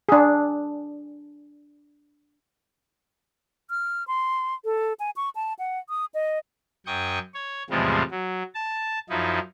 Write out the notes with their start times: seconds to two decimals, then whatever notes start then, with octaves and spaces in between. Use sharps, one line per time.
0.09 D4 G#4
3.70 F6
4.07 C6
4.65 A4
5.00 G#5
5.16 C#6
5.35 A5
5.59 F#5
5.89 D#6
6.14 D#5
6.86 F#2 G5 C#6 D#6
7.34 C#5
7.70 E2 A2 C3 F3 G3 G#3
8.11 F#3
8.55 A5
9.10 F#2 F3 D#4 E4